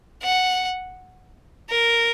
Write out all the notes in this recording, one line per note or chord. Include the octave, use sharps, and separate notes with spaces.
F#5
A#4